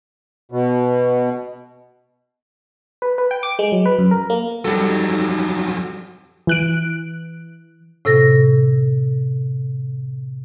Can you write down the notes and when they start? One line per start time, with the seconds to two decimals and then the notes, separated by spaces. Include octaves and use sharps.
0.51 B2
3.02 B4
3.18 B4
3.31 G5
3.43 D6
3.59 G#3
3.72 F#3
3.86 B4
3.99 F#2
4.11 A#4
4.30 A#3
4.65 F2 F#3 G3 D#4 A4
6.47 E3 F#6 D7
8.05 A2 C3 A4 A#6